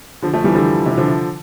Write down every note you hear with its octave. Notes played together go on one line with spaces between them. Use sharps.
D3 F3
F3 A3
E3 G3
D3 F3
C3
D3 F3